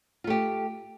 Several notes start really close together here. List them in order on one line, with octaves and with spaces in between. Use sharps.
F4 A3 G4